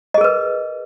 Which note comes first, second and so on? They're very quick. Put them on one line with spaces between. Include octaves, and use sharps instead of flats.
D#5 G#4 A#4 B4